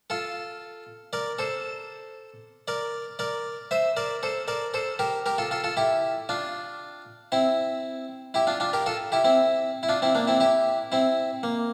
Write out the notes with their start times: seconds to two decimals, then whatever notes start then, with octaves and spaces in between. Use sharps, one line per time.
0.10 F4 A4
1.13 A#4 D5
1.39 A4 C5
2.68 A#4 D5
3.19 A#4 D5
3.71 C5 E5
3.97 A#4 D5
4.23 A4 C5
4.48 A#4 D5
4.74 A4 C5
4.99 G4 A#4
5.26 G4 A#4
5.38 F4 A4
5.51 F4 A4
5.64 F4 A4
5.77 E4 G4
6.29 D4 F4
7.32 C4 E4
8.34 E4 G4
8.47 D4 F4
8.60 D4 F4
8.73 G4 A#4
8.86 F4 A4
9.12 E4 G4
9.24 C4 E4
9.83 E4
9.89 D4 F4
10.02 C4 E4
10.15 A#3 D4
10.27 C4 E4
10.40 E4 G4
10.92 C4 E4
11.43 A#3